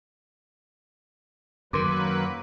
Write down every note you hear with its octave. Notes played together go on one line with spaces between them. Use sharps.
F#2 D#3 F#3 A#3 A#4 B4 C6 D6